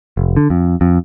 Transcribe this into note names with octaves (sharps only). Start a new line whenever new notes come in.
F1
D3
F2
F2